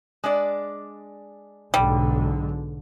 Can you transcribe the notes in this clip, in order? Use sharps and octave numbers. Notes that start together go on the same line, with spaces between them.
G#3 D4 D5
B1 G#2 D3 G3